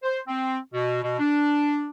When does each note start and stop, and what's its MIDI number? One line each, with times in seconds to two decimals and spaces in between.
0.03 0.19 72
0.27 0.57 60
0.74 0.99 47
1.03 1.18 47
1.19 1.89 62